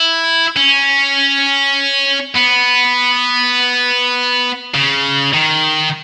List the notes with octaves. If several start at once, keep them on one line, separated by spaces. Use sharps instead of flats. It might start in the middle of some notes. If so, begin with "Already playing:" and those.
Already playing: E4
C#4
B3
C#3
D#3